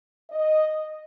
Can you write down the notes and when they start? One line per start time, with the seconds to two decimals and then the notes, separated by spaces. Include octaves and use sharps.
0.30 D#5